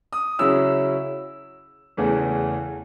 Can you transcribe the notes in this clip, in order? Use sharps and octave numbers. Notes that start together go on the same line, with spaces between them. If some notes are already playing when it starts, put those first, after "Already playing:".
D#6
C#3 F#3 C#4 E4 E6
E2 C#3 E3 A3